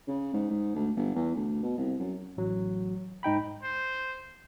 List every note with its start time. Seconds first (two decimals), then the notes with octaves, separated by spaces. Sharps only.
0.08 C#3
0.33 G#2
0.50 G#2
0.75 D2
0.96 G1
1.15 E2
1.36 D2
1.63 B2
1.78 C2
1.99 F#2
2.37 A1 F#3
3.23 G#2 D#4 G5 B5
3.63 C5